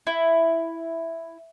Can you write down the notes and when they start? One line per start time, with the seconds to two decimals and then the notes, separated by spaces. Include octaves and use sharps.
0.07 E4